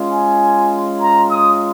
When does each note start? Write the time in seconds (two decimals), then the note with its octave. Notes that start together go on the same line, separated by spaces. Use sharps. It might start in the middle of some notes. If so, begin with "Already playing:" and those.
Already playing: G#3 C#4 F4
0.12 G#5
1.00 A#5
1.29 D#6